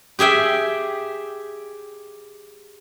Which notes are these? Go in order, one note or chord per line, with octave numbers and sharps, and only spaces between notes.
G4 G#4 E5 G5